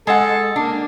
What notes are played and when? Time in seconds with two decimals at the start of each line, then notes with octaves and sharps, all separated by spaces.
0.07 G#3 A4 F#5
0.56 A#3 D4